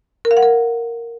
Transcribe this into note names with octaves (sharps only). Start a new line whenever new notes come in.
A#4
F5
F#5
A#4